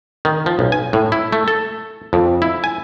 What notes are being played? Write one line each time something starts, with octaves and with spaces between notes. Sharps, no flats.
D#3
F3
B1
G#5
A2
E4
A3
A4
F2
E4
G#5